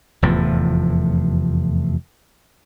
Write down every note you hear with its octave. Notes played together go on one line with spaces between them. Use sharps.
F1 E2 A2 F3